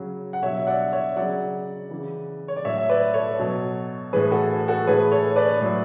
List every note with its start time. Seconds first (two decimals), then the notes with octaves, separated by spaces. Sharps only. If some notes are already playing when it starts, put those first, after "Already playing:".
Already playing: C#3 F#3
0.33 F#5
0.42 B2 F#3 C#5 E5
0.57 E5
0.67 D5 F#5
0.92 C#5 E5
1.16 C#3 F#3 D5 F#5
1.91 C#3 E3
2.48 C#5
2.56 D5
2.65 A2 F#3 C#5 E5
2.78 E5
2.89 B4 D5
3.14 A4 C#5
3.39 B2 F#3
4.13 A2 E3 G#4 B4
4.31 F#4 A4
4.68 F#4 A4
4.86 A2 E3 G#4 B4
5.11 A4 C#5
5.36 B4 D5
5.61 A2 F#3